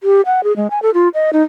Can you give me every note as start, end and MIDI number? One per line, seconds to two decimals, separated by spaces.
0.03 0.21 67
0.26 0.43 78
0.44 0.55 68
0.56 0.67 56
0.70 0.81 80
0.82 0.90 69
0.94 1.08 65
1.14 1.30 75
1.33 1.43 63